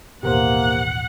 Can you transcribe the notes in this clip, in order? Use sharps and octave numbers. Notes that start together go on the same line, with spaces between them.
A1 D#2 B2 A#3 G4 A#4 C5 F#5